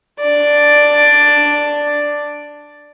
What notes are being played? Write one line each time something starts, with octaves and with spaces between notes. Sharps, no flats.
D4 D5